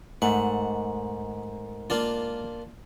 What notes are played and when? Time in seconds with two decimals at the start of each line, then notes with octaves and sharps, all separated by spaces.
0.22 G#2 A3 A#4 F#5
1.90 A#3 D4 F4